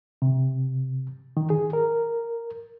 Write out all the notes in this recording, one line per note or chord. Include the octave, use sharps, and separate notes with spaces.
C3
D#3
G#4
A#4